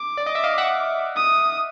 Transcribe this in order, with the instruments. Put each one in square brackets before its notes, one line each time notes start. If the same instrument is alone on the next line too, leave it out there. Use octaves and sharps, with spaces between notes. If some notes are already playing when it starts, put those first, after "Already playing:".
Already playing: [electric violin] D6
[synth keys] D5
D#5
E5
D#5 F5
E5 F#5
[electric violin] D#6